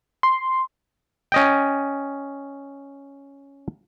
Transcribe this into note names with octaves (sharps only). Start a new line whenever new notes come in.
C6
C#4 D#5 G5